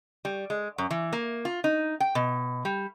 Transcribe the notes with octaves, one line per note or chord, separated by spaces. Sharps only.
G3
G#3
F#2
E3
A#3
F4
D#4
G5
B2
G3